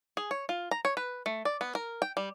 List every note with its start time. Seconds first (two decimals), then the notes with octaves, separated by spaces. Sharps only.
0.17 G#4
0.31 C#5
0.49 F4
0.71 A#5
0.85 C#5
0.97 B4
1.26 A3
1.45 D5
1.61 B3
1.75 A#4
2.02 G5
2.17 G3